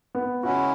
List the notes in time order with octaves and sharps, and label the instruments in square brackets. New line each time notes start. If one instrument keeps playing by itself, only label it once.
[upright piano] B3
[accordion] C#3 G#3 C#4 E4 [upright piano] F#4